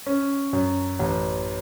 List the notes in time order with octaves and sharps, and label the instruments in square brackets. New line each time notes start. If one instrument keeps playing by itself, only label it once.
[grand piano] C#4
F#2
A1